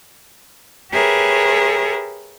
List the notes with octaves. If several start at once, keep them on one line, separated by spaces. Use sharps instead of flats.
G4 G#4 A#4 B4 C#5 E5